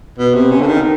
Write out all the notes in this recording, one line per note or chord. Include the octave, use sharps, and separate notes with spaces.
B2
C3
C#3
D3
D#3